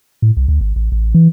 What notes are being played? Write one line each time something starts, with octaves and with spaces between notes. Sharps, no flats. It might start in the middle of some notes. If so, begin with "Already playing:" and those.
A2
C2
D2
G#1
A1
A1
E3